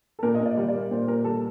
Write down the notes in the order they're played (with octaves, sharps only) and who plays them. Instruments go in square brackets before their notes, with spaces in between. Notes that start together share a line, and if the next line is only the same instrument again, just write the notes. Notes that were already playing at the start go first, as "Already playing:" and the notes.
[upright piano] A4
A#2 A#4
D#5
A#2
D5
G3
D5
A#3
A#2 C5
A#2 A#4
G3 A4